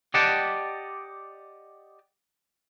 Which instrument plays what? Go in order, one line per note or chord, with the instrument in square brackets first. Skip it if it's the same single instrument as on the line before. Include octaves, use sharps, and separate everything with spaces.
[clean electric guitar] G4 D5 D#5 F#5 G5 A5